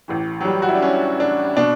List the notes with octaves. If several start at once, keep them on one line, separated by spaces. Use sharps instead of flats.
A1 A2 E3
F#3
G3
F#4
E4
D4
C#4
D4
B2 D4